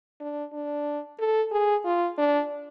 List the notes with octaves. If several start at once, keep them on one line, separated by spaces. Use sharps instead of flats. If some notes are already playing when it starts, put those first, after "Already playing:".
D4
D4
A4
G#4
F4
D4